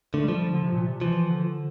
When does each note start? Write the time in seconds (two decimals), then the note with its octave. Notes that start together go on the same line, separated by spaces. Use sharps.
0.14 D3 A3
0.24 G3
0.28 F3
0.34 G3
0.53 D3
0.63 C3
0.73 A#2
0.87 C3
1.01 E3 F3
1.30 D3